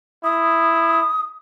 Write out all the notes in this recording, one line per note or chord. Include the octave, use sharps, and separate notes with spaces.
E4 D#6